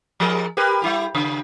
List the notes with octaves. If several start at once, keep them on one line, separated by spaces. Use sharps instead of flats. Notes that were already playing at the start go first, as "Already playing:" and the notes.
F3 G#4 A#4
G4 A#4 B4
G3 E4 G4
C#3